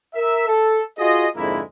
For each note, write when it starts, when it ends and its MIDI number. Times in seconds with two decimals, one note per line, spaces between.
0.15 0.47 70
0.15 0.47 76
0.47 0.81 69
0.98 1.26 65
0.98 1.26 66
0.98 1.26 68
0.98 1.26 75
1.36 1.60 41
1.36 1.60 44
1.36 1.60 50
1.36 1.60 56
1.36 1.60 58
1.36 1.60 64